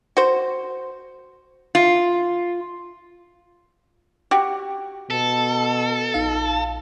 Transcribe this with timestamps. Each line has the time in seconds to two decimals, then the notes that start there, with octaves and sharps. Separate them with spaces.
0.17 F#4 C5
1.75 F4
4.31 F#4 G4
5.10 B2 A4
6.14 A#1 D#4 F5